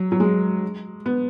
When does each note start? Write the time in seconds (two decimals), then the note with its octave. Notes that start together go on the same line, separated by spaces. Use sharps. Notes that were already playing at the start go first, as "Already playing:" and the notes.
Already playing: F#3
0.12 F#3
0.20 G#3
1.06 B3